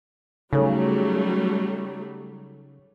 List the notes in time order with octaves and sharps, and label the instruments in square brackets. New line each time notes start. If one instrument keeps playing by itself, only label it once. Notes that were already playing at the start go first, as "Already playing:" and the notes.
[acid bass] C#3 [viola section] F#3 G3 A3 [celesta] D#4 A4 C#5